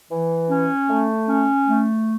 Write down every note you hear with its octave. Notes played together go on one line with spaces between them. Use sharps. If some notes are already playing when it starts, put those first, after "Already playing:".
E3
C#4
A3
C#4
A3